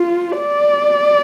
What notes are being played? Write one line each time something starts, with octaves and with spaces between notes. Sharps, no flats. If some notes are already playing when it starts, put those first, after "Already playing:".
Already playing: F4
D5